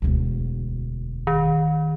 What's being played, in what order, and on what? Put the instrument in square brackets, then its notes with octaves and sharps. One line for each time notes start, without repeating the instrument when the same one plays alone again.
[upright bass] E1 D2
[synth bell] D#3